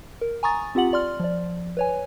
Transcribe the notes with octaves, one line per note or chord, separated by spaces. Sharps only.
A#4
G#5 A#5 C#6 D#6 A6
C4 F4 G4 F#5 F#7
D5 C6 F6
F3 D5
B4 C#5 G#5